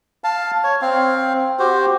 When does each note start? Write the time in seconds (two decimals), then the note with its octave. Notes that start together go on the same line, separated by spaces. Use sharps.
0.24 F5 A5
0.64 C#5
0.82 C4 F5
1.59 F#4 G4 C5